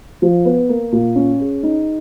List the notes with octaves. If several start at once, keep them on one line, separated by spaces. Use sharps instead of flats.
F3
B3
A#3
A#2
C#4
G#4
D#4